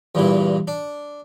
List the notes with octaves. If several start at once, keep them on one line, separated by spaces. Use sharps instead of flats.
E2 G2 A#2 E3
D4